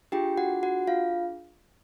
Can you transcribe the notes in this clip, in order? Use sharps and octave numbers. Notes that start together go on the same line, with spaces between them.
D4 F4 G4 G#4 G5
F#4 F#5
F#4 F#5
F4 F5